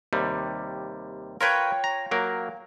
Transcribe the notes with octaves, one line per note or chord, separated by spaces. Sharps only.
D#2 C3 G3
F4 A#4 B4 C#5 G5
A#5
F#3 A#3 A#4